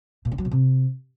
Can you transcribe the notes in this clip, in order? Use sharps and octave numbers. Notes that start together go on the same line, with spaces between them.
A#2
D3
F#3
B2
C3